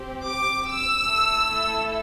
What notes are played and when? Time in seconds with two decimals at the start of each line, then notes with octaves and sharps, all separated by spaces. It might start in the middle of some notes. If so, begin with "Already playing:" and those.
Already playing: C4 G4
0.26 D6
0.67 E6
1.07 A3 E4 A4